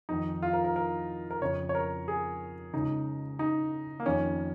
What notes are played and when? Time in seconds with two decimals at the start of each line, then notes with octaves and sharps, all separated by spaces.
0.09 F2 D#3 D#4
0.42 F4
0.53 A#4
0.65 A#4
0.76 A#4
1.31 A#4
1.41 F2 C#3 C#5
1.69 C#5
1.75 A#4
2.08 G#4
2.73 C#2 C#3 D#4
3.39 D#4
4.00 A#3
4.06 F2 D#3 C#4